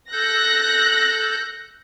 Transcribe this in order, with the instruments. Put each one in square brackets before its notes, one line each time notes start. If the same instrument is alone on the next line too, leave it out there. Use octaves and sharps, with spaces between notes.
[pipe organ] A4 G6 [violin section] F#6 A#6